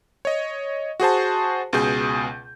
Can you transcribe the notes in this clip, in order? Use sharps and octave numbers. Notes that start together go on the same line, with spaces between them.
C#5 D#5
F#4 G#4 C5 A5
C#2 B2 G#4 G6